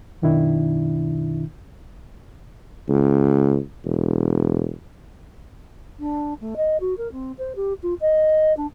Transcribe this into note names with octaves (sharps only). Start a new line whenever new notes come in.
F#2 B2 D#3 D4 E4
C#2
E1
D4
A3
D#5
F#4
A#4
C4
C5
G4
F4
D#5
D4